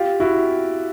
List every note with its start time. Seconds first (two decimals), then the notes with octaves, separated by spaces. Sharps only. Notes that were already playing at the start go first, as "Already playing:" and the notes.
Already playing: F4 G4
0.20 E4 F#4